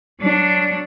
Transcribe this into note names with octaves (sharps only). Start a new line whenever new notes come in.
F#3 D4